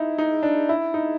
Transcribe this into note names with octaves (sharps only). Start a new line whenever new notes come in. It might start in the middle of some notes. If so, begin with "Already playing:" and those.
Already playing: D#4 E4
D#4
D4
E4
D#4